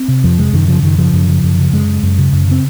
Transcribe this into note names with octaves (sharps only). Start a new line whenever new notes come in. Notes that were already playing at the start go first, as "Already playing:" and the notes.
Already playing: C4
C3
F2 F3
C3 G#3
F#2 D#3
C#3 F3
F#2 D#3
C#3 F3
F#2
C#3
F#2
C#3
F#2 G#3
C#3
F#2
C#3
F#2
C#3 C4